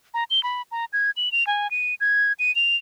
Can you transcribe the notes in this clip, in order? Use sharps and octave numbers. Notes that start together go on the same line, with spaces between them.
A#5
G7
B5
A#5
G#6
F#7
F7
G#5
D#7
G#6
D#7
F7